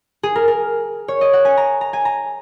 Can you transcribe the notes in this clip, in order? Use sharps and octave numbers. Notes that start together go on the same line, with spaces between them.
G#4
A#4
A#4
C#5
D#5
F#5
G#5
A#5
A#5
G#5
A#5